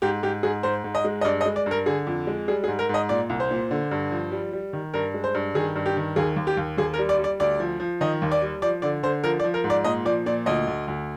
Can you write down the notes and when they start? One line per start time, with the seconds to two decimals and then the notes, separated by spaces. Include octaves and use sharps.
0.02 G#2 G4
0.23 G#2 G4
0.43 G#2 G#4
0.63 G#2 C5
0.84 G#2
0.95 D#5
1.04 G#3
1.21 D#5
1.25 G2 D5
1.41 D#5
1.46 G#3
1.56 D5
1.66 G2
1.71 A#4
1.86 D3 G#4
2.07 F2
2.27 G#3
2.48 G3 G#4
2.64 G#4
2.68 G#2
2.79 A#4
2.89 G#2
2.94 D#5
3.09 A#2 D5
3.29 C2
3.40 C5
3.51 A#2
3.71 D3
3.91 G2
4.12 F3
4.32 G3
4.53 G3
4.73 D#3
4.94 G2 A#4
5.14 G#3
5.24 C5
5.35 G2
5.55 D#3 G#4
5.76 G2
5.86 G4
5.97 D#3
6.16 D#2 G#4
6.36 D#2
6.47 G4
6.57 D#2
6.77 D#2 G#4
6.94 A#4
6.98 G3
7.09 D5
7.19 G3
7.24 D5
7.40 D2 D5
7.60 F3
7.80 F3
8.01 D#3 D#5
8.22 D#2
8.31 D5
8.42 G3
8.62 F3 D5
8.82 D3 D5
9.03 D3 C5
9.24 F3 A#4
9.40 D5
9.44 F3
9.54 A#4
9.64 G#2
9.70 D5
9.84 A#2 D#5
10.05 F3 D5
10.26 A#2 D5
10.46 D2 D#5
10.67 D2
10.88 D2